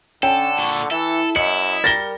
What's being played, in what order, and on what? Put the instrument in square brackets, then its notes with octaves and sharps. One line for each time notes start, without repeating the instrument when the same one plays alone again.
[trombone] D3 [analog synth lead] C#4 [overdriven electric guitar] A4 [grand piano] G5
[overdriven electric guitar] A#2 A4 [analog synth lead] C#6
[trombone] E3 [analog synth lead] E4 [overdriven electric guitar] A4
[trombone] F#2 [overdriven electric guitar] E4 [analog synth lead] D#5 [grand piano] C#7
[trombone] G3 [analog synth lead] A#4 [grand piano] A6 A#6 G7